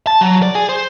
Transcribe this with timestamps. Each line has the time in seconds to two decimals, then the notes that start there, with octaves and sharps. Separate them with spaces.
0.07 A5
0.21 F#3
0.43 D5
0.55 G#4
0.69 C5